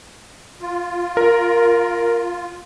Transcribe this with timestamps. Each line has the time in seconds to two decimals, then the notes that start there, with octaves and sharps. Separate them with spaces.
0.61 F4
1.17 A#4